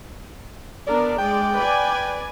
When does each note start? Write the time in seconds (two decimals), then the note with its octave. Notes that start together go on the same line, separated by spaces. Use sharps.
0.87 B3 D4 A#4 D5
1.18 G#3 D5 G5
1.53 B4 D5 G#5